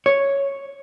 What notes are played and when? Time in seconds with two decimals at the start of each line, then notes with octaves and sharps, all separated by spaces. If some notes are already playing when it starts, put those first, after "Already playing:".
0.06 C#5